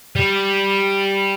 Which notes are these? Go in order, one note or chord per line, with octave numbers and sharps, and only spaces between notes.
G3